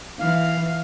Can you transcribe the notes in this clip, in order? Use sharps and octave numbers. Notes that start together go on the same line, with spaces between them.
E3 F5